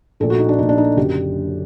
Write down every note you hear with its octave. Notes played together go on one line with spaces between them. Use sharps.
A#1 A#2 A3 A4
F#4
D#4
D4
A#1 A#2 A3 D#4
D4
D#4
F#1 F#2 D3 G4